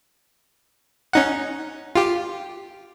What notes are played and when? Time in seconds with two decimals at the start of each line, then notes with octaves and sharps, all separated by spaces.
1.13 C#4 D#4 F#5
1.96 F4 G4